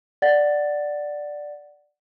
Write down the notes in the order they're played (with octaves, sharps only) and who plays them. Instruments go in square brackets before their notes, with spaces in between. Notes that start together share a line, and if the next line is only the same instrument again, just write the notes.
[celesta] D5 F#5 A6